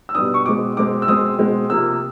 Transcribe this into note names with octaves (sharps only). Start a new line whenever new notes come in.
E6
B2 G3 B3 D4 D#6
C#6
B2 G#3 C4 D6
B2 G#3 C4 D6
E6
B2 G#3 C4 D#6
B2 G#3 C4
C3 F3 A#3 E6